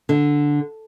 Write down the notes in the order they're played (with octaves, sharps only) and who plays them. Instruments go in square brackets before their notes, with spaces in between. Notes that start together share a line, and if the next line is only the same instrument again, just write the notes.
[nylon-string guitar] D3